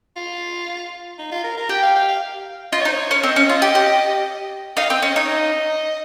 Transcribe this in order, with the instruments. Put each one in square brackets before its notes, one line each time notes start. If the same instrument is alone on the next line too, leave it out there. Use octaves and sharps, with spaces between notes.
[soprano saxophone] F4
D#4
F4
A#4
A#4
[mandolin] G4 [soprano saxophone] G5
[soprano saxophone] F5
F5
F5
[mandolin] F4 [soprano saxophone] D#5
[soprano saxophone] C#5
[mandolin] D#4
[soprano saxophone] C5
C#5
[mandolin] C#4
[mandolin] C4 [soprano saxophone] D#5
[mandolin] C#4
F4
G4
G4
[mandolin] D#4 [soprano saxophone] F5
[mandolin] C4 [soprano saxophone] G5
[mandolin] C#4 [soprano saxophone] D#5
[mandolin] D#4 [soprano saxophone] C#5
[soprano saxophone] D#5